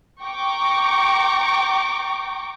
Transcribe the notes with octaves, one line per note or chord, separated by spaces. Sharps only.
G5 A#5 C#6 D6